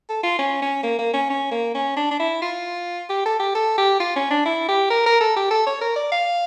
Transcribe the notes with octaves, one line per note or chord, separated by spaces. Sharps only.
A4
F4
C#4
C#4
A#3
A#3
C#4
C#4
A#3
C#4
D4
D4
E4
F4
G4
A4
G4
A4
G4
F4
C#4
D4
E4
G4
A#4
A#4
A4
G4
A4
C#5
A#4
D5
F5